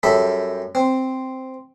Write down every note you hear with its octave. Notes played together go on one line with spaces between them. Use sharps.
F#2 G3 A4 E5 B5
C4